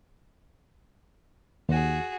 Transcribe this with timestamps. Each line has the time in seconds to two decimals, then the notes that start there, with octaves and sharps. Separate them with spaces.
1.69 D#2 F#4 G#4